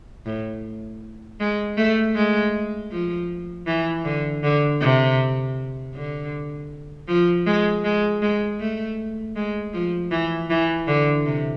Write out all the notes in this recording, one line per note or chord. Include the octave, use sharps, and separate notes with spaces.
A2
G#3
A3
G#3
F3
E3
D3
D3
C3
D3
F3
G#3
G#3
G#3
A3
G#3
F3
E3
E3
D3
C3